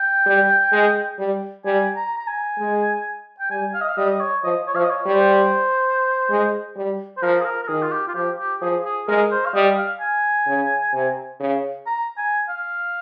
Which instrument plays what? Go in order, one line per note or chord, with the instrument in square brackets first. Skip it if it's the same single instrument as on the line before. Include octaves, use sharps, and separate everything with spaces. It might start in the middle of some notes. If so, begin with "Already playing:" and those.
Already playing: [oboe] G5
[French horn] G3
G#3
G3
[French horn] G3 [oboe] G#5
[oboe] A#5
A#5
G#5
[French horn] G#3
[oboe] G5
[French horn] G3 [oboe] G#5
[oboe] F5
D#5
F5
[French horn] G3 [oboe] D#5
[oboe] D#5
C#5
[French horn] F3 [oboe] D#5
[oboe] C#5
[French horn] F3 [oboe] F5
[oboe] D#5
C#5
[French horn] G3
[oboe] C5
[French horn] G#3
G3
[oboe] C5
[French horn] F3 [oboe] A#4
[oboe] G#4
A#4
A#4
[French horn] D#3 [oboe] G#4
[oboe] F4
G4
F4
[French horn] F3 [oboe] G4
[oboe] G4
[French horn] F3 [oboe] G#4
[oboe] G#4
[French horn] G#3 [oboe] A#4
[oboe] C5
F5
[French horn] G3 [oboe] D#5
[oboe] F5
G#5
[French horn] C#3
C3
C#3
[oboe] A#5
G#5
F5